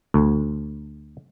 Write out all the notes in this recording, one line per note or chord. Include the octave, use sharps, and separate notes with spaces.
D2